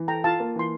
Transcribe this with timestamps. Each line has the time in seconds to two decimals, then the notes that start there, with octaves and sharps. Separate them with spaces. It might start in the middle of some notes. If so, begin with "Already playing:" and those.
Already playing: E3
0.08 A4 G5 A#5
0.24 F4 F5 A5
0.40 A#3
0.56 E3 C6